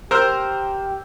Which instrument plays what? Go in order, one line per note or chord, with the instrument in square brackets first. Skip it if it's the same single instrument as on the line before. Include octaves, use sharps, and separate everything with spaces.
[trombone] G4 [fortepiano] A#4 C5 [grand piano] E6 G6